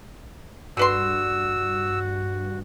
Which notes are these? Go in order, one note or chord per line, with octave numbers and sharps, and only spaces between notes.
G2 D3 F#4 B4 C6 E6